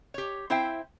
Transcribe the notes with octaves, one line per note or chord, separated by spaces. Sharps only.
G4 C#5
C4 E4 C5 E5 F5 G5